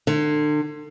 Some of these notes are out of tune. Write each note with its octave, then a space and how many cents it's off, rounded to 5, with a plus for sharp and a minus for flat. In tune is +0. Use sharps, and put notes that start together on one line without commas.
D3 +35